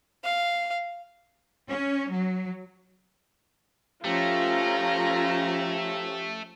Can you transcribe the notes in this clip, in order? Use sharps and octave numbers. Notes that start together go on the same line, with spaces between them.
F5
C#4
F#3
F3 A3 C#4 F4 G4 A#5